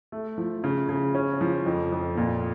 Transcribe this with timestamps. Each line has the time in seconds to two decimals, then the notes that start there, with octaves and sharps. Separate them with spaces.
0.12 A3
0.38 F3
0.64 C#3
0.89 C#3
1.15 C#4
1.41 F3
1.66 F2
1.92 F2
2.17 A#2